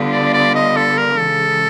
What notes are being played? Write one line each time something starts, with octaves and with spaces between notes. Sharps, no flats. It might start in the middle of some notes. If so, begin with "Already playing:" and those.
Already playing: D3 G3 B3 D4 F4
D5
D5
D#5
A4
A#4
C#3 E3 G#3 A4